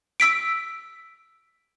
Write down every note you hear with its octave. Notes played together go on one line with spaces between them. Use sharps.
E6 B6 D7